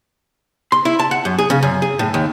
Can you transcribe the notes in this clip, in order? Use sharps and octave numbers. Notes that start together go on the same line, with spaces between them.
C6
E4
A5
F#5
F#2
G#4
C#3
F#2
G#4
A2
D#2